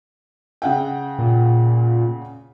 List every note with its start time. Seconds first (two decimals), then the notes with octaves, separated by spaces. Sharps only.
0.62 C#3 F#5 G5
1.18 A#2